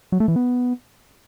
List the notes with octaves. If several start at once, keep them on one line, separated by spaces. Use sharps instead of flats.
F#3
A3
E3
B3